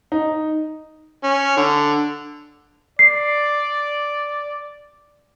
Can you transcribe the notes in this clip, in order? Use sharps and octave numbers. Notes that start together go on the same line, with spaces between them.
D#4
C#4
D3
D5 C7